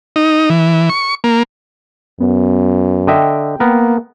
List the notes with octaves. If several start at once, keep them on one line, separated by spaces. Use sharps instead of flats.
D#4
E3
C#6
A#3
F#2 B3
D3 D#5 E5 G5
A#3 B3 A#4